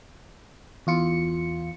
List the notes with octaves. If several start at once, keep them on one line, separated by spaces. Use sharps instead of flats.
E2 F4 C#7